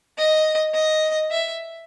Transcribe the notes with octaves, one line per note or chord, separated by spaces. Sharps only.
D#5
D#5
E5